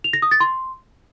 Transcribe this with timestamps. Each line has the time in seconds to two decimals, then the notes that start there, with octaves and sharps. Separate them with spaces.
0.04 F7
0.13 A#6
0.22 D#6
0.31 A6
0.40 C6